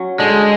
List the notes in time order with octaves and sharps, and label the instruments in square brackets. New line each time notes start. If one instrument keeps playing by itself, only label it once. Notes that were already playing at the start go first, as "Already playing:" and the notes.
Already playing: [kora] F#3 C#4
[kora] D3 [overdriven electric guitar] G#3